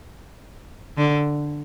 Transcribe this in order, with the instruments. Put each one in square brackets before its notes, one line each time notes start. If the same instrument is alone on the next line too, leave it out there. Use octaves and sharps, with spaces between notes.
[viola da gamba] D3